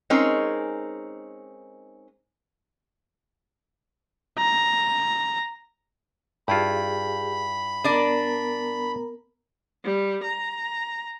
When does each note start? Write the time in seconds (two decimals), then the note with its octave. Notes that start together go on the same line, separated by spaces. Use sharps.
0.10 G#3 C4 C#4 D#4 A#4
4.38 A#5
6.48 G2 E4 F4 G4 G#4 B5
7.84 B3 D4 A#4 D5 A#5
9.84 G3
10.23 A#5